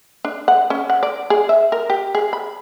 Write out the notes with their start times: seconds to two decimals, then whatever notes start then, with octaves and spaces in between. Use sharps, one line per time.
0.25 D4
0.48 F#5
0.70 C#4
0.90 F#5
1.03 D5
1.30 G#4
1.49 E5
1.72 A#4
1.90 G4
2.15 G#4
2.33 B5